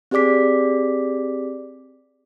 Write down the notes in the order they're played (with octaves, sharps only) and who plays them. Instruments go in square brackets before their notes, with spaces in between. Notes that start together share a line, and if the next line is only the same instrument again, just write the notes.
[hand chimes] C4 G4 G#4 D5 D6 B6